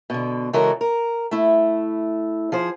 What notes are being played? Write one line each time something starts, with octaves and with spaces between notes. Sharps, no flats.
B2 D3
C#3 E3 G#3 F#4 A4 A#4
A#4
A3 E4
F3 G#4 C5